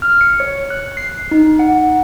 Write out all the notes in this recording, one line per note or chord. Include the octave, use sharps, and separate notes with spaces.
F6
C#7
C#5
F#6
C7
D#4
F#5